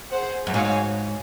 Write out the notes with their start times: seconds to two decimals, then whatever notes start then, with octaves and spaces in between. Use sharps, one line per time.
0.11 G#4 C5 F#5
0.47 F#2
0.54 G#2 F#4 C#5 F5 G#5